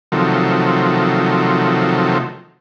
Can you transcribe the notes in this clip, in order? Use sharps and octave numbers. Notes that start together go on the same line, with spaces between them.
C3 D#3 F3 F#3 A3